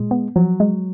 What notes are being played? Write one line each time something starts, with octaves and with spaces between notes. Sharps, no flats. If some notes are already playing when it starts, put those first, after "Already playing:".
Already playing: A#2 G#3
B3
F3 F#3
G#3